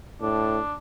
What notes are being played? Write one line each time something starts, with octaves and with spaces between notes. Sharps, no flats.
A2 D4